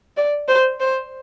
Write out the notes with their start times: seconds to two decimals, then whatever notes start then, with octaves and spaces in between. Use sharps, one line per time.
0.17 D5
0.48 C5
0.80 C5